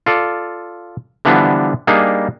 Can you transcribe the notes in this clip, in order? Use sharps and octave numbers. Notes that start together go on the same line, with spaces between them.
F4 A4 D5
D3 E3 F3 G3 B3 D4
G3 A#3 D4 D#4 G#4